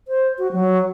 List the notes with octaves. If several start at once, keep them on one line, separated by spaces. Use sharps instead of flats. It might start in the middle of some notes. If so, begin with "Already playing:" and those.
C5
F#4
F#3